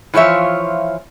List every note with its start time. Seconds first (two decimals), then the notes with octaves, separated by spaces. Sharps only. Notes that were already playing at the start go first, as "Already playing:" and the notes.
0.14 E3 F3 F4 C#5 E5